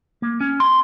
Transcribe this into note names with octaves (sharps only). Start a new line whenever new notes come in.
A#3
C#4
C6